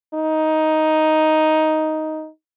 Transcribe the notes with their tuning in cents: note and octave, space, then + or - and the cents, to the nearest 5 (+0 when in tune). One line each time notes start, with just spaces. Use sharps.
D#4 +5